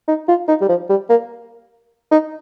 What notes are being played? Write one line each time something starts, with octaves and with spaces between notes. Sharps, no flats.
D#4
F4
D#4
G3
F3
G3
A#3
D#4